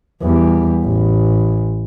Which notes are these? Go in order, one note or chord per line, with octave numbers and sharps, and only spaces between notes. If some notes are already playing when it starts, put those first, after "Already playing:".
E2 G3
A1